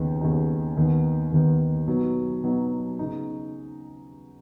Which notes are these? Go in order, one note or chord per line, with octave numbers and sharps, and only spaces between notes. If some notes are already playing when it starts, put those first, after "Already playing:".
Already playing: D#2 C#3 B3 D#4
D#2 C#3 B3 D#4
D#2 D#3 B3
D#2 D#3 B3
B2 F#3 B3 D#4
B2 F#3 B3 D#4
C#3 B3 D#4